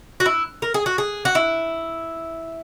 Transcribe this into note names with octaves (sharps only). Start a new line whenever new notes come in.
F#4
E4
A#4
G#4
F#4
G#4
F#4
E4